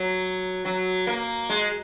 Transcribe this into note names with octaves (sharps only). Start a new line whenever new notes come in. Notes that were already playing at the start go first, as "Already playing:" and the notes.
Already playing: F#3
F#3
A#3
G#3